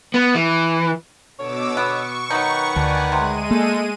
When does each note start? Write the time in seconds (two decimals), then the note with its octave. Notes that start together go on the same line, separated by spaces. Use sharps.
0.14 B3
0.35 E3
1.38 B2 D3 C#5 D6 E6
1.77 B3 C#6
2.30 D#3 F#3 D#4 B4 F#5
2.76 D2 D4 D5 G#5
3.12 C3 G#3 D#7
3.51 A3 A#3 A4